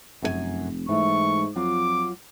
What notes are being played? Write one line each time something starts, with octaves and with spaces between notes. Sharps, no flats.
F1 F#2 A4 G#5
G#2 E3 A3 C#6
F2 F#3 F4 D6